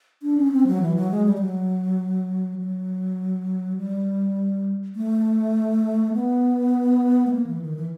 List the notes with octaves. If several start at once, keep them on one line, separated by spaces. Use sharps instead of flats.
D4
C#4
C4
F#3
E3
F#3
G#3
G3
G3
F#3
F#3
G3
A3
B3
A3
A#3
E3
D#3
E3